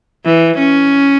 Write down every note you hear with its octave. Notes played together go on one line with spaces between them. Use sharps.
E3
C#4